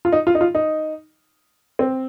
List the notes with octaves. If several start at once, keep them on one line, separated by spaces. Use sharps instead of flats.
F4
D#4
F4
D#4
F4
D#4
C4